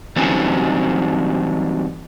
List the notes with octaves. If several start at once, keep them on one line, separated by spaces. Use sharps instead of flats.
E3 F#3 G3 C4 C#4 D#4